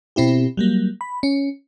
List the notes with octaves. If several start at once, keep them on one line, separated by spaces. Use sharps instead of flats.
B2 C4 E4 G4
F#3 G3 A#3
B5
C#4